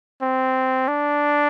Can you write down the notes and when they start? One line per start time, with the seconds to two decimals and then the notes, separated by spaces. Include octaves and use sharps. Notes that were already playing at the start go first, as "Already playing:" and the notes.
0.21 C4
0.88 D4